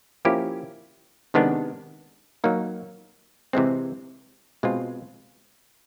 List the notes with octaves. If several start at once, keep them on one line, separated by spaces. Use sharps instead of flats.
F3 A#3 C#4 E4 G4
C3 D#3 G#3 B3 D4
F#3 A#3 D#4
C3 E3 G#3 C4
B2 G#3 C4 F4